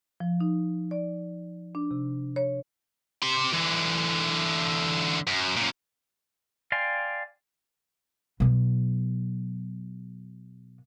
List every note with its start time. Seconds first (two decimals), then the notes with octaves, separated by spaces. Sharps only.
0.20 F3
0.41 D#4
0.91 D5
1.75 D4
1.91 C3
2.36 C#5
3.23 G4 C6
3.54 D3 E3
5.27 F#2
5.57 F#2 A#2
6.72 D5 F5 G5 G#5 C6
8.40 B2 F#3